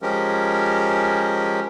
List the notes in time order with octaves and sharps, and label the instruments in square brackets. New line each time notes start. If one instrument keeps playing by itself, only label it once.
[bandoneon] F3 G#3 C#4 G4 A#4